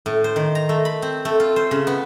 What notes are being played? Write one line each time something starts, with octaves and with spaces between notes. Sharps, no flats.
A2
C5
D#3
A#5
A3
B5
C4
A3
F4
C5
C#3
B3